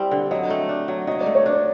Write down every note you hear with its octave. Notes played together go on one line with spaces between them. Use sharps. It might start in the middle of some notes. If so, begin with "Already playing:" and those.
Already playing: G3 C4 E4
D3
F#3 D#5
A3
D4
F#3
F#3 D#5
D5
A3
C#5
D4 D5